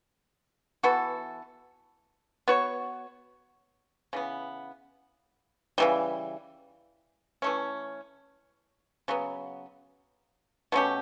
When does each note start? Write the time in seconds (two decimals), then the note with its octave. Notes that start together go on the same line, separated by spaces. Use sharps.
0.83 E3 B3 F#4 A4
2.48 B3 F#4 C#5
4.13 C#3 E3 B3
5.78 C#3 E3 G3
7.42 E3 A3 C#4
9.08 C#3 F#3 B3
10.72 B2 A3 C#4 G4